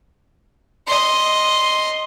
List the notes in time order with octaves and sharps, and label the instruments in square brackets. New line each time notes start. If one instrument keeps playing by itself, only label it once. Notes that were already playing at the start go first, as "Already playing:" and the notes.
[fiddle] D#5 C6